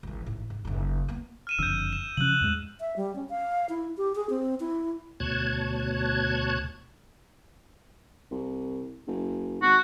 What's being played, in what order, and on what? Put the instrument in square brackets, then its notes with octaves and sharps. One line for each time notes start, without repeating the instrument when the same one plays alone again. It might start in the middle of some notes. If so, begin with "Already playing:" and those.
[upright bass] G#1 E3
A1 G#2
G#2
F#1 D#4
A#3 B3
[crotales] F6 D#7 E7
[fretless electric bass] F#1 F2 D3 [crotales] E6 G6
[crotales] E7
[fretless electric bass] C#3 F3 C#4 [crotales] F#6 F#7
[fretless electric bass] E2 G#2 G#3
[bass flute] E5
G3
C#4
F5
E4
G4
G#4
C4
E4
[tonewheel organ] D2 B2 C#5 A5 F#6 G#6
[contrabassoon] C2
F#1
[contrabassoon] G#1 [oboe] F#4